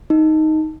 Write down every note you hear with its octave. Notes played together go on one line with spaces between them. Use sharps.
D#4